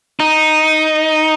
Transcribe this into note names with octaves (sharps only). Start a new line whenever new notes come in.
D#4